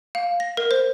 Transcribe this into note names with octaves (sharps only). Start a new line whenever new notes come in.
F5
A#6
A#4
C5